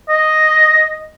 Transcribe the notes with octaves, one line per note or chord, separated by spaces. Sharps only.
D#5